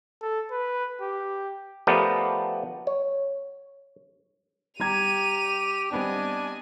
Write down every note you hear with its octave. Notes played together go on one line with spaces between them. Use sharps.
A4
B4
G4
F3 A3 B3 G4 A#4 D5
C#5
G3 G4 A#5 G#6 D#7 F7
G3 B3 C4 D4 D#5 G#5